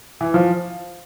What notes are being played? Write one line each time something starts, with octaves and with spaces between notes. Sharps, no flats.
E3
F3